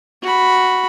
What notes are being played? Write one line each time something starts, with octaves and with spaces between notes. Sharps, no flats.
F#4 B5